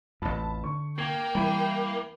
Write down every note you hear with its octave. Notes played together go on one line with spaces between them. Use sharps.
A1 F2 A5 B5
D3 C#6
A#3 G5 G#6
E3 G3 B5 D#7